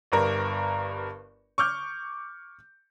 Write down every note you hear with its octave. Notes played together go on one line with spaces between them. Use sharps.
G1 G2 A#4
C#6 D6 F6 G6